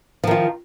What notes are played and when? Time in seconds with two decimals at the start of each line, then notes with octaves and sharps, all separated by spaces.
0.24 F3
0.27 D#3
0.31 F4